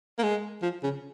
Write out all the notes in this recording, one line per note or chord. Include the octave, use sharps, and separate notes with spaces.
A#3
G#3
F3
C#3